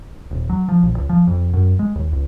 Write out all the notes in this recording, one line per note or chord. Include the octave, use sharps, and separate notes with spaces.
D#1
F#3
F3
A#1
C#2
F3
F2
F#2
G#3
D#2
C#2